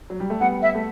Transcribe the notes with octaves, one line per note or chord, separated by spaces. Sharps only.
F#3
G3
A3
G3 B3 F#5
E5
A3